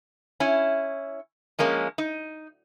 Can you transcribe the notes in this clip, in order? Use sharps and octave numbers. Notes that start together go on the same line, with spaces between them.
C#4 E4
F3 G#3 A#3 C#4
D#4